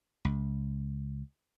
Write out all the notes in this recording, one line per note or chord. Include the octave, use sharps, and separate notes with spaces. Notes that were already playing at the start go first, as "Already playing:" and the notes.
C#2